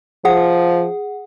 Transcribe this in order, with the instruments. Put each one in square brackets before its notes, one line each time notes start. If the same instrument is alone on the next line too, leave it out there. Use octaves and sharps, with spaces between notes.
[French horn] F3 [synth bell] G#4 F#5